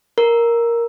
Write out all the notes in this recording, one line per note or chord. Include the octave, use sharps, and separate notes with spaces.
A#4